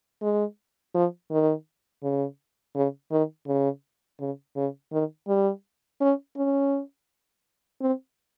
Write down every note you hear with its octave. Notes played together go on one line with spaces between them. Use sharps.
G#3
F3
D#3
C#3
C#3
D#3
C#3
C#3
C#3
D#3
G3
C#4
C#4
C4